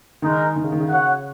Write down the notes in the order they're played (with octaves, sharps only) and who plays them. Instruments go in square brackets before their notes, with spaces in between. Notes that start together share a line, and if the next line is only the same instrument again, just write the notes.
[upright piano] D#3 [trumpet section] G#3 D#4 A#4
[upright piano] D#3
C#3
D#3
C#3
[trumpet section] F#4 C#5 F#5